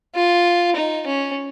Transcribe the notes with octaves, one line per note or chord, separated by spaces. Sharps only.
F4
D#4
C#4